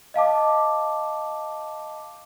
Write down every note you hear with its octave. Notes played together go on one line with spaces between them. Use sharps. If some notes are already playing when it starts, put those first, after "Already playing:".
D#5 F5 A5 D6